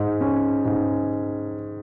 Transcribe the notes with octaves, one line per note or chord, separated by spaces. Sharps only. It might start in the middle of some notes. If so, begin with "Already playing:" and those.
Already playing: G#2
C#4
G#2